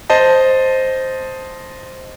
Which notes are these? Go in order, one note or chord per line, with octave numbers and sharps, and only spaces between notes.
C5 D#5 A5